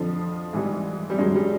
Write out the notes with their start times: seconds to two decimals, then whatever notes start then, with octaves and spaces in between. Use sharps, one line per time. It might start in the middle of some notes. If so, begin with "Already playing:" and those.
Already playing: F2 D3 F3
0.53 G#2 E3 G3
1.10 G3
1.18 F#2 D3 F#3 G#3
1.35 G3